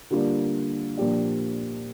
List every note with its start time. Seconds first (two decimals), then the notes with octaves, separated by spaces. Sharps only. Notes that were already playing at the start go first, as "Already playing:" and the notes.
0.11 D3 G3 A#3 F4 D5
0.97 A#2 F3 D4 G4 D5